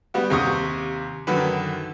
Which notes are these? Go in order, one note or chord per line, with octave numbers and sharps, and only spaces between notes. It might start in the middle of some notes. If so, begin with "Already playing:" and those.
G3 B3 F#4
D#2 C3 C#6 D#6
F#2 D3 D#3 B4